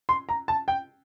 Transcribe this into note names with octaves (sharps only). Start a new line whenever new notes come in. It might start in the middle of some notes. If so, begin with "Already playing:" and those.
C6
A#5
A5
G5